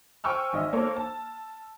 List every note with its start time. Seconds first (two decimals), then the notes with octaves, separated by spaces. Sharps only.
0.24 C5 G5 G#5 C#6 E6 F6
0.53 G#1 D#5 E5
0.73 A#3 A4 C5 C#5
0.96 A5